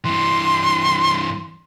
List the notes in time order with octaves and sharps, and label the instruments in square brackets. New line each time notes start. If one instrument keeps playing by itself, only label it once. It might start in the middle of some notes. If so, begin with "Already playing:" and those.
[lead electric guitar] G2 E3 [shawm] C6